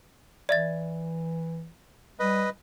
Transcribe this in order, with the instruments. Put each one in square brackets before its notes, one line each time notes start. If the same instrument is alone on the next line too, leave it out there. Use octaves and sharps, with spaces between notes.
[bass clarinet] E3 [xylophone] D5 E5 A6
[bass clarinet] G3 [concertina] B4 D#5